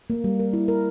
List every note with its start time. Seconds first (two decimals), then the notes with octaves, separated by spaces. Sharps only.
0.10 A#3
0.24 G3
0.39 A#4
0.53 E4
0.68 A#4